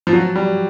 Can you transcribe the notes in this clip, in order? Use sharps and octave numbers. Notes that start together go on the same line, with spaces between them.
F3
F#3
G3